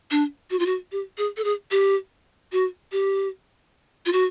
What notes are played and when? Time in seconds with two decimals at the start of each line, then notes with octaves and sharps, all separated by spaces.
0.11 D4
0.51 F#4
0.59 F4
0.66 F#4
0.92 G4
1.18 G#4
1.37 A4
1.44 G#4
1.71 G4
2.52 F#4
2.92 G4
4.06 F4
4.13 F#4